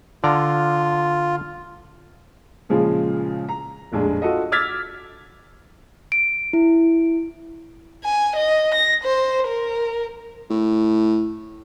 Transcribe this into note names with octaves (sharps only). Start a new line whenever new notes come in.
D3 F4 D5 A#5
A#2 C#3 F3 G#3
A#5
F1 A#1 G#3 D4
F4 F#4 A4 D#5
D6 E6 F6 G#6 A6 B6
D7
E4
G#5
D#5
A#6
C5
A#4
A2